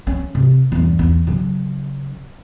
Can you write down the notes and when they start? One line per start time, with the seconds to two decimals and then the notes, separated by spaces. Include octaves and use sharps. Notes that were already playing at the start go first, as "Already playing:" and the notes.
0.07 C#4
0.35 C3
0.72 E2 G2
0.99 E2
1.27 C#3 F#3